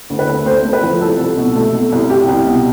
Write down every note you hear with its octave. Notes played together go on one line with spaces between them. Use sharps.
D2
B4
A3
A3 C5
A3
B4
F3
C2 A4
C2
B2
A3
B2
C2
C2 G4
C2
B2